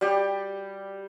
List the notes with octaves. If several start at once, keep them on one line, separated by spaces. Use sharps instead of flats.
G3 G4